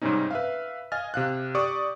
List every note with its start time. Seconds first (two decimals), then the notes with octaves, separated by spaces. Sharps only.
0.02 G#2 C3 G3 C4 C#4 D#4
0.31 B4 E5 F5
0.92 D#5 F5 G#5 F6 A6
1.14 C3 F5 F#6
1.55 G4 D5 C#6 D#6